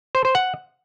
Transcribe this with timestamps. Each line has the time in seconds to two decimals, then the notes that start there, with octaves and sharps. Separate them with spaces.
0.15 C5
0.25 C5
0.35 F#5